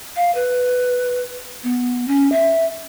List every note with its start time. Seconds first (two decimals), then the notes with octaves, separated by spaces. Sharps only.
0.16 F5
0.35 B4
1.63 B3
2.08 C#4
2.32 E5